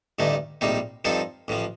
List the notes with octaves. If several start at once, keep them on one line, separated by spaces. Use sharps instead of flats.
A1 G2 D3 A3 D#4
A#1 A2 G3 C4 D#4
G2 F3 C4 D#4 A4
A1 A2 F3